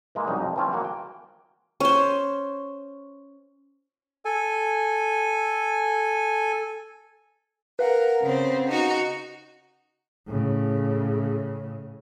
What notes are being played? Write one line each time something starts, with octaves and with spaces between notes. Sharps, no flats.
E3 G#3 A#3
C2 F#2 C#4 D#4 G#4
F2
E3 F3 C4 C#4 F4
A#3 F#4 G#4
G5
C#4 C5
A4 G#5
A#4 B4 F5 F#5
C#3 C4
D#4 F#4
A2 C#3